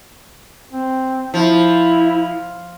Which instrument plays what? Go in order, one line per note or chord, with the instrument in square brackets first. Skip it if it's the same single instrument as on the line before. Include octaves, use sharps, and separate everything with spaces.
[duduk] C4
[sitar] F3 [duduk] E4